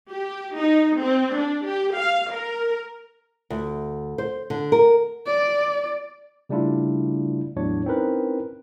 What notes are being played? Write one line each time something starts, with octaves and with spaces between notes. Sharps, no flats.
G4
D#4
C4
D4
G4
F5
A#4
D2
C5
D3
A#4
D5
C#3 G3 A3 D4 E4 F4
E2 A2 F#3 D4 C#5
C4 C#4 D#4 E4 A#4 B4